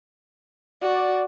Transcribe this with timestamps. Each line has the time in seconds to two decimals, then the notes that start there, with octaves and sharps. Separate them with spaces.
0.81 F#4 D5